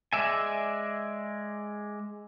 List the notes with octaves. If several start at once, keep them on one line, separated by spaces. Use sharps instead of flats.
G#3 D5 E5 G#5